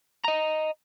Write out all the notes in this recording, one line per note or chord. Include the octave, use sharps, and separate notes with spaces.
D#5 A#5